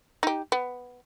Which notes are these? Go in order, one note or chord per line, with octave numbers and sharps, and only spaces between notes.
D#4 G4
B3